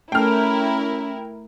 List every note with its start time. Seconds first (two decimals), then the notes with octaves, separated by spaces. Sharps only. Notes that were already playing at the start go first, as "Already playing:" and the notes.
0.12 A3 C#4 E4 A4 A#4 G5 F6